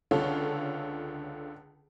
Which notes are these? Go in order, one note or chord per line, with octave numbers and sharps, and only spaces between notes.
C#2 D3 F4 A4 C#5